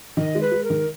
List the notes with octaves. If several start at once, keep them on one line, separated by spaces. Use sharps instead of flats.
D#3 D#5
G#3
B4
G#3
A#4
D#3